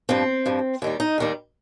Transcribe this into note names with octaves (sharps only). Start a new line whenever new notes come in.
G2 F3 C4
G2 F3
D#2 D#3 G3
D#4
D#2 D#3 G3